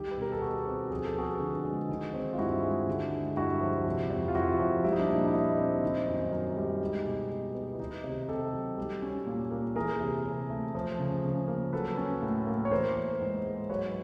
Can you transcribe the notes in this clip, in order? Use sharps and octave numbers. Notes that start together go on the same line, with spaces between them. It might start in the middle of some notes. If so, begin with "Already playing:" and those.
Already playing: D#3 G3 G4 A4
B4
B2 A#4
A4
B2 F#4 G#4
C4
F3 G#4
A4
B3 F#4 G#4
D3
G#3
D#3
C4
F4
G2 E4 F#4
G#3
D3
G#3
G2 E4 F#4
F3
C3
F2
F4
F2 E4 F#4
F3
G3 E4
D#4
D4
A#2 D#4
E4
A#2 D#4
C4
D#3
F#2
F#2 D#4
G3
G#3
B2
B2
B3
E4
D#3 D#4
C3
C3 G4 A4
F#3
G3
C#4
A#2
A#3
E3 G#4 A#4
C3
C3
A3
F3
C#3
C#3
A#3
F#3 A4 B4
C#4
A2
A#3
C#5
E3 A#4 C5
B3
G#2
G#3
F#3 B4 C#5